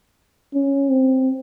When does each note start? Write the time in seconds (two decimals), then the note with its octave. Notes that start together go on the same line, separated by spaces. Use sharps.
0.54 C#4
0.90 C4